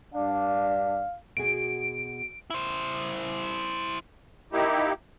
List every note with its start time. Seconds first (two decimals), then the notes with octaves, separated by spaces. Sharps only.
0.15 G2 D4 F5
1.37 B2 F#4 G#4 D7
2.50 E4 C5
4.53 A#3 D#4 E4 G4